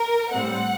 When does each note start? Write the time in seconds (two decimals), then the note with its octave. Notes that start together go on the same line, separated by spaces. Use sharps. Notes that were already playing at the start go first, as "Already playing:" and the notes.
Already playing: A#4
0.32 A2 G3 C4 F#5